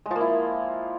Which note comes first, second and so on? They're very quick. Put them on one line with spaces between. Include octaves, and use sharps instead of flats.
G#3 F3 A#3 E4